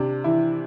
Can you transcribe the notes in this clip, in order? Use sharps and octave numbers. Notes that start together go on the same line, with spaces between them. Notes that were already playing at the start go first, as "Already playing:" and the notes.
Already playing: C3 D4
E3 E4